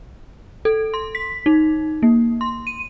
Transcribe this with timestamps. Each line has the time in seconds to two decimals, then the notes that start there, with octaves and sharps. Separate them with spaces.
0.65 A4
0.94 C6
1.15 B6
1.46 D#4
2.03 A#3
2.41 C6
2.67 D#7